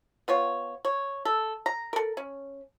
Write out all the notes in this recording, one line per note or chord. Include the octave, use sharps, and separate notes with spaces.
B3 F4 C#5
C#5
A4
A#5
A4 A#4
C#4